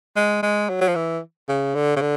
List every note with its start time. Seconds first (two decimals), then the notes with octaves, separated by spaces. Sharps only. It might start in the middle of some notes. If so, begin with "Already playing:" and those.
0.16 G#3
0.43 G#3
0.69 F#3
0.81 F#3
0.88 F3
0.96 E3
1.49 C#3
1.75 D3
1.96 C#3
2.01 D3